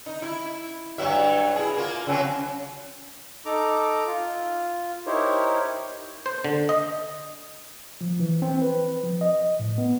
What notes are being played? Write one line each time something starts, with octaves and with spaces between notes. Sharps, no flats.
D#4
E4
G2 F#3 E5
E4 G#4
A#3 F4
C#3 F#3 C4
D#4 A4 A#5 D6
F4
D#4 E4 G4 A#4 C5 C#5
C5
D3
D#5
F3
E3
C4
B4
F3
D#5
A2
B3